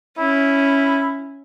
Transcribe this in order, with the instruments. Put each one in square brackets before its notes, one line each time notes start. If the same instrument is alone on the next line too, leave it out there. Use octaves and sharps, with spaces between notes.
[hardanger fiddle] C#4 [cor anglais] E4